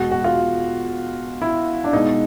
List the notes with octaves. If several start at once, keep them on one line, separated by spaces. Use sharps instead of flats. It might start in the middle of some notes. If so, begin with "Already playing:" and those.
Already playing: E2 B2 G#3 F#4
F#4
F4
E4
D4
B2 G#3 B3 D#4